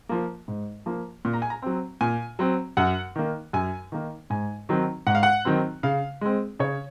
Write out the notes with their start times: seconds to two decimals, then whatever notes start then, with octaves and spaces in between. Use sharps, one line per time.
0.09 F3 A#3
0.48 G#2
0.86 F3 A#3
1.25 A#2
1.33 A#5
1.42 G#5
1.50 A#5
1.62 F#3 C4
2.01 A#2 G#5
2.39 F#3 C4
2.77 F#2 F#5
3.16 D#3 A#3
3.53 F#2 G#5
3.92 D#3 A#3
4.30 G#2 G#5
4.69 D#3 F#3 C4
5.07 G#2 F#5
5.15 F5
5.23 F#5
5.45 D#3 F#3 C4
5.83 C#3 F5
6.21 G#3 C4
6.59 C#3 C#5